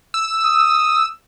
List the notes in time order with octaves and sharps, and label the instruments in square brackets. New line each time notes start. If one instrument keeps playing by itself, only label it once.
[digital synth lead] E6
[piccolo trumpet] D#6